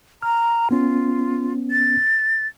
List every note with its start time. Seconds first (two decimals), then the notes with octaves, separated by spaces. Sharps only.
0.22 A#5 F6
0.71 B3 C#4 F4
1.71 A6